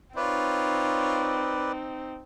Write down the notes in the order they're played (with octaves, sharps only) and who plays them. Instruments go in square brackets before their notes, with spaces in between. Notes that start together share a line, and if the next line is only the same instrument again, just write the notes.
[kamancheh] C4 D#4 [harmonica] F4 C#5 [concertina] B4 D5